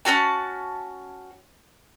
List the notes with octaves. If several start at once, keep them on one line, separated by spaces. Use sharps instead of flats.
C#4 F4 F#4 A5